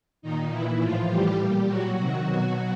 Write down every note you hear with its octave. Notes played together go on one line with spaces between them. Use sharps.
A#2 D#3 D#4
A#2 E3 E4
A2 E3 F3 F4
A2 E3 G3 G4
A#2 G3 G4
A#2 F#3 F#4
C3 D#3 F#3 F#4
B2